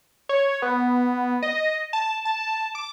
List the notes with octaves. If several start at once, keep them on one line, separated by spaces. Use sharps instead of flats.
C#5
B3
D#5
A5
A5
D6